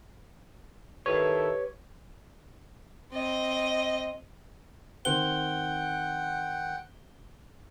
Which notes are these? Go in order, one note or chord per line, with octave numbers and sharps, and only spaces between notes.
D#3 E4 G4 A4 B4 C#5
C4 D#5
D#3 C4 C5 F#5 G5 G7